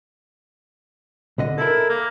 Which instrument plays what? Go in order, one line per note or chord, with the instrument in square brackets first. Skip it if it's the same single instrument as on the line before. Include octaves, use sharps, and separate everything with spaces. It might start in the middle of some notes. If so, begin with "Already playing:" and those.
[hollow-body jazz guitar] C2 D3 D#5
[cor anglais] E4 [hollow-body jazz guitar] A4 A#4
[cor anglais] A#3